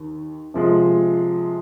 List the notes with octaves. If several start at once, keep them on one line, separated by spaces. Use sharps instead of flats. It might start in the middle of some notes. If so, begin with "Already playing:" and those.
Already playing: D#2 D#3
C3 F3 G#3